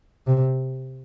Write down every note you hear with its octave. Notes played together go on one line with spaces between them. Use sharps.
C3